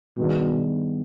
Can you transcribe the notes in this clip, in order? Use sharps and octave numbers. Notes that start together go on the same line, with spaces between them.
G2 B2 D#3 B3 D4 G#4